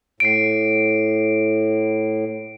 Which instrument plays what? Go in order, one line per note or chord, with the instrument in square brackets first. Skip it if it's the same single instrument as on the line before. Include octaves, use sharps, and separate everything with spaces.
[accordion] A2 [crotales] C7 D7